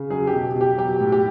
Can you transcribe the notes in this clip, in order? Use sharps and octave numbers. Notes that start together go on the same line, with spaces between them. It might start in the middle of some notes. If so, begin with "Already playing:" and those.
Already playing: C#3
F#3 G#4
G4
B2
B2
G4
F#3 G4
A2
G4